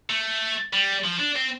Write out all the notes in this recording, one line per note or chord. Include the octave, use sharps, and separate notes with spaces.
A3
G3
F3
D4
C4